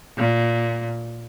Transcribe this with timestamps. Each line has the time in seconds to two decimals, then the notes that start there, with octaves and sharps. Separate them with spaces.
0.17 A#2